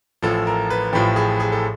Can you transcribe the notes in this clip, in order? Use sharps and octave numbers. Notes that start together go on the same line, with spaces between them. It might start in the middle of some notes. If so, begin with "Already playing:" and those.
A1 A2 F3 A4
A#4
B4
A1 A2 F3 G4
G#4
G#4
A4